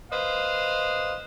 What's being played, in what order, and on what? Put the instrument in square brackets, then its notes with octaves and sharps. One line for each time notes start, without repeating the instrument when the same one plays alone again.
[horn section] B4 C5 D#5 F5